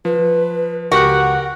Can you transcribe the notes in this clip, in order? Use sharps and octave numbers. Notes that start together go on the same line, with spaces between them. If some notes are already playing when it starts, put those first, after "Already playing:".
F3 B4
C#2 F#4 G4 A#4 F#5 F#6